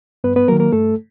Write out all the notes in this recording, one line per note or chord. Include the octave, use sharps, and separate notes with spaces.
G2 B3 B4
B3 B4
D#3 F#3 A#3 A#4
A#3 A#4
G2 A3 A4